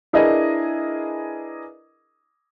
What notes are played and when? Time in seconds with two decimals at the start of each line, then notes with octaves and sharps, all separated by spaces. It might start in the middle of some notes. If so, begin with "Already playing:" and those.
0.13 D4 E4 G#4 A#4 B4 D#5